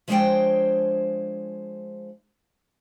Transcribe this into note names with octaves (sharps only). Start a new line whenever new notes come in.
F3 G#3 D4 C5 C#5 G5